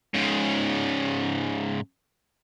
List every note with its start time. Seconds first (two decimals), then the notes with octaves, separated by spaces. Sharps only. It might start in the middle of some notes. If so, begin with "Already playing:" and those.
0.14 G#2 C#3